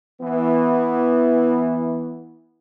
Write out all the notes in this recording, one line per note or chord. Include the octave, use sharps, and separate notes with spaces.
E3 B3